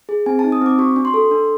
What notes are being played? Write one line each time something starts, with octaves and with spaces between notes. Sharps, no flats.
G#4
C4 G#5
A5
D#4
D#6
C4 D6
F#4 C#6
D4
C6
A4
D4